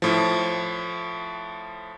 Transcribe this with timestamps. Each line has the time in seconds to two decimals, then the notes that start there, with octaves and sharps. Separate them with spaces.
0.02 A2 F3